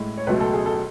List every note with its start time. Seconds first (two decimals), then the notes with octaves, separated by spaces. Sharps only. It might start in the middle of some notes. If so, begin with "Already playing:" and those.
Already playing: A2 G#3
0.18 C#5
0.27 C#2 B2 F#3 A3 B4
0.41 A4
0.54 G#4
0.66 A4